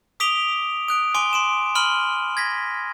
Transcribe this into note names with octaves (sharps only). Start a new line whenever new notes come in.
D6 D#6 B6 D7 F7 G7
D#6 F#6 D7
G#5 C6 D6 D7 G7
C6 D7 E7
B5 C6 F6 D#7 F#7 G7
G#6 A#6 B6